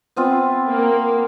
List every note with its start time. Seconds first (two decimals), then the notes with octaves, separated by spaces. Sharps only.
0.16 B3 C4 F4
0.67 A#3